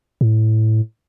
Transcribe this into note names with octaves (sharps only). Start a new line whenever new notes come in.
A2